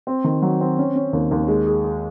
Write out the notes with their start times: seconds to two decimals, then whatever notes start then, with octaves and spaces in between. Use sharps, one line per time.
0.07 C4
0.24 D#3
0.42 F#3
0.60 C4
0.78 C#4
0.96 C#4
1.13 D#2
1.31 D#2
1.48 G#3
1.67 G#4
1.84 G#4